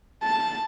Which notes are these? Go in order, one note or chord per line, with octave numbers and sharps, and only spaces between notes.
A5